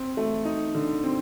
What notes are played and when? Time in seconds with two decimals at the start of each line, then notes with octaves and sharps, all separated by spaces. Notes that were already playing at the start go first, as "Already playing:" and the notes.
Already playing: C4
0.17 A3
0.45 D#4
0.75 D3
1.04 C4